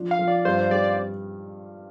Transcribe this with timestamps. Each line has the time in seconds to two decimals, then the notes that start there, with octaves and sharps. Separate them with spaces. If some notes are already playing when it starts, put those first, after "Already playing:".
Already playing: F3 D4
0.11 F5
0.19 F3
0.28 D5
0.45 G2 C5
0.59 C5
0.71 G3 D5
0.84 D5